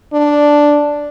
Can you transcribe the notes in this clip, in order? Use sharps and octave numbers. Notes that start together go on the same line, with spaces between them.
D4